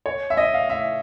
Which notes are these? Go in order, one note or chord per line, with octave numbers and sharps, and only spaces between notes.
C#5
E5
D#5
F5
E5